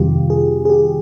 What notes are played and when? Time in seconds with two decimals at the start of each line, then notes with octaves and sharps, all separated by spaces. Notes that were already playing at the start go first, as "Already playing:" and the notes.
Already playing: F2 C3 D#3 G3 F4 G4
0.30 G#4
0.65 G#4
0.70 G4